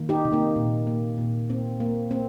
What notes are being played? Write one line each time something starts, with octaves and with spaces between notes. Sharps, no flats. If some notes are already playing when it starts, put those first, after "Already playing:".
Already playing: D#3 A#3
D#4 G4
C3
A#3 D#4
A#2
A#3
A#2
A#3 C4
A#3
A#3 C4